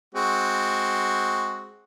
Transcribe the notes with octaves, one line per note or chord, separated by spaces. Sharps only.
G#3 C4 F#4